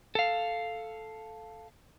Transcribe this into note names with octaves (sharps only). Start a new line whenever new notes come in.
A4 F5